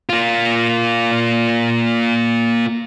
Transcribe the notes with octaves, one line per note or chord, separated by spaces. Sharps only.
A#3 F4